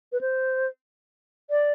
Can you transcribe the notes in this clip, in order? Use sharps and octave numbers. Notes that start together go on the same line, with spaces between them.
B4
C5
D5